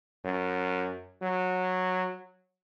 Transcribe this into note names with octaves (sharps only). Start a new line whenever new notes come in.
F#2
F#3